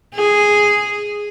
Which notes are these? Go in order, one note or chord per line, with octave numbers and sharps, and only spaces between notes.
G#4